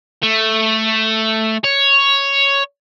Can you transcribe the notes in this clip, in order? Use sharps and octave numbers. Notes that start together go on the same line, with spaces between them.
A3
C#5